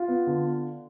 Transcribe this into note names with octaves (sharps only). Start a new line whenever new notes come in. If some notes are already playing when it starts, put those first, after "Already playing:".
Already playing: F4
B3
D3